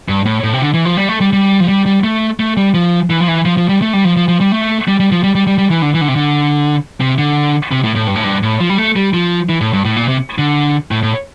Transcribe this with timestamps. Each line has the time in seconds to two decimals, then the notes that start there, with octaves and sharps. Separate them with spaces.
0.09 G2
0.25 A2
0.44 A2
0.53 C3
0.61 D3
0.74 E3
0.85 F3
0.97 G3
1.09 A3
1.21 G3
1.33 G3
1.60 F3
1.68 G3
1.86 G3
2.04 A3
2.40 A3
2.57 G3
2.74 F3
3.10 E3
3.20 F3
3.28 E3
3.45 F3
3.57 F3
3.69 G3
3.82 A3
3.93 G3
4.05 F3
4.17 F3
4.28 F3
4.41 G3
4.52 A3
4.88 G3
5.00 G3
5.12 F3
5.23 G3
5.35 G3
5.47 G3
5.58 G3
5.70 E3
5.82 D3
5.94 E3
6.01 D3
6.08 C3
6.16 D3
7.01 C3
7.18 D3
7.72 C3
7.84 A2
7.96 A2
8.07 G2
8.16 A2
8.24 G2
8.43 A2
8.61 F3
8.70 G3
8.78 A3
8.96 G3
9.14 F3
9.49 E3
9.61 A2
9.73 G2
9.85 A2
9.96 A#2
10.08 C3
10.38 D3
10.91 A2
11.03 A2